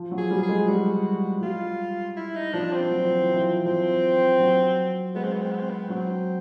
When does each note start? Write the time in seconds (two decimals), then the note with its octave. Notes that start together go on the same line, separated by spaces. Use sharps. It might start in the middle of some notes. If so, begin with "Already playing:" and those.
Already playing: F3
0.11 F#3
0.17 G#4
0.30 G3
0.43 G#4
0.49 G#3
0.68 G3 F#4
1.42 G3 F4
2.16 E4
2.35 D#4
2.54 F3 D4
2.73 C4
2.91 F#3
3.05 F3
3.18 E3
3.33 F3
3.65 F3 C4
4.40 F#3
5.15 G#3 B3
5.24 C4
5.32 B3
5.42 C4
5.52 B3
5.60 C4
5.70 B3
5.89 F#3 C4